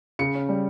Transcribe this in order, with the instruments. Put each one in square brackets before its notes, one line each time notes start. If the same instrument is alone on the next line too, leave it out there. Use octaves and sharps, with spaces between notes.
[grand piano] C#3 C#7
C#4
G3